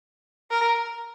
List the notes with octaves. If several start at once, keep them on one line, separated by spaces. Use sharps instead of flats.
A#4